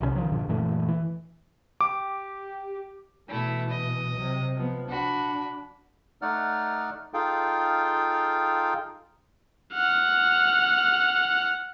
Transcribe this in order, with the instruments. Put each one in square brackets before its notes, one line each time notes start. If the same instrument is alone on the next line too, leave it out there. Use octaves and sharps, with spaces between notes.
[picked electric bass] B1 C3 G3 C#4
D#3 F3 F#3
A#1 G2 A#2 D3
F#2 A#2 E3 A3
E3
[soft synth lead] G4 [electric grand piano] D6
[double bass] B2 E3 [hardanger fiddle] A3 E4
[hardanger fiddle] D#5
[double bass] C3 F#3
F3 B3
[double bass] D4 [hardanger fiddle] F#4 B5
[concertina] A3 D#4 D5 F#5 F6
D#4 F4 G#4 A4 F5 G5
[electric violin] F#5 F6